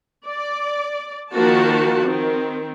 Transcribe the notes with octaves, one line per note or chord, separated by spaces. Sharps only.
D5
D#3 F3 A#3 F#4 A5
D#3 C4